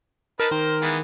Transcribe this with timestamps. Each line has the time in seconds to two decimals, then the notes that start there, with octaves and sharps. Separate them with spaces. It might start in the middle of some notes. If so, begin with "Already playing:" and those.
0.40 D#4 A#4 B4 A5
0.51 D#3 C5
0.81 E3 G#3 B3